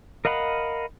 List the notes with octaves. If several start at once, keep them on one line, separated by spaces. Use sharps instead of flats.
A#4 D#5 F5 F#5 B5